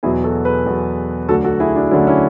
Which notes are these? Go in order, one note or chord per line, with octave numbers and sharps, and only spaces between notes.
E2 B2 F#3 E4 G#4
F#4 A4
G#4 B4
E2 B2 F#3
D2 D3 F#3 F#4 A4
F#4 A4
E4 G#4
D4 F#4
D2 D3 F#3 C#4 E4
C#4 E4